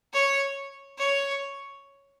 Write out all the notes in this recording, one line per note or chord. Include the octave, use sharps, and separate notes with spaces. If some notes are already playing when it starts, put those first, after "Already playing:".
C#5
C#5